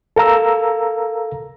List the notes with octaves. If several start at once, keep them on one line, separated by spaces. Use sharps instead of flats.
A4 A#4 F5 A#5 E6